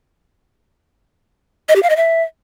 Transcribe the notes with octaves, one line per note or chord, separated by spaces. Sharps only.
D#5
G4
F5
D#5
E5